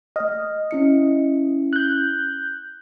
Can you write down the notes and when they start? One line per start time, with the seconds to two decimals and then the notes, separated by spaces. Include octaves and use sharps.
0.16 A3 D#5 F6
0.71 C#4 E4 C#7
1.73 F#6 G6